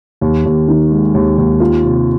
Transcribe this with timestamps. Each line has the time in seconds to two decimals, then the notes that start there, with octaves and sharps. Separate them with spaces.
0.21 D#2
0.45 D#2
0.68 D#3
0.91 G#3
1.14 D#2
1.38 D#2
1.60 F4
1.84 C3